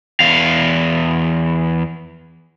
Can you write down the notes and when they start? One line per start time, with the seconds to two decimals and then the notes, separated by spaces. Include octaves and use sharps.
0.20 E2 F5